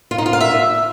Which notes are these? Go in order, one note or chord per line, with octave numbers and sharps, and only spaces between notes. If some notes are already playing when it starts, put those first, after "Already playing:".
F4
D#4
F4
F5
E5